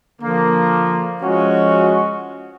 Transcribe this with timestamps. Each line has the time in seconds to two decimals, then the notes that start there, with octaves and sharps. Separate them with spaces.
0.22 D3 F3 A#3
1.22 F3 G#3 C#4 F#4